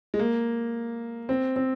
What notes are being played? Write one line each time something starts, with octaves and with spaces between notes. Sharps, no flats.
G#3
A#3
C4
C4